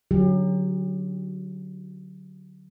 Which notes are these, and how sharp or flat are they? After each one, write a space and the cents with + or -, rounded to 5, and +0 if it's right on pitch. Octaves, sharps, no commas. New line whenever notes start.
D3 +0 F#3 +0 G4 +35